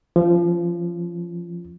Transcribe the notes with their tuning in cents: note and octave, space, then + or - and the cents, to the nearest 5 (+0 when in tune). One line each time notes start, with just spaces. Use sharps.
F3 -20 C#4 +0